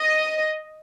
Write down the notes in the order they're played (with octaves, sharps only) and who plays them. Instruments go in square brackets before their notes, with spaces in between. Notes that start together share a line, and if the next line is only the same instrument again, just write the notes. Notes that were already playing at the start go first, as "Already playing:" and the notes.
Already playing: [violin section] D#5